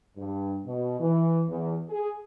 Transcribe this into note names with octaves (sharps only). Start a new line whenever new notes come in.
G2
B2
E3
E2
G#4